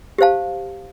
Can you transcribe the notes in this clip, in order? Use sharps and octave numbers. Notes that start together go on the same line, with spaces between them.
G4 C5 F5 A5